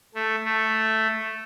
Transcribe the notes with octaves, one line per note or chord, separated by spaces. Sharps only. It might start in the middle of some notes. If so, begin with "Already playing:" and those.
A3
A3